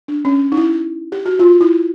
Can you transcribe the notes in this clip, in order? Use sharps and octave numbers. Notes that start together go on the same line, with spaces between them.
D4
C#4
D#4
E4
G4
F#4
F4
E4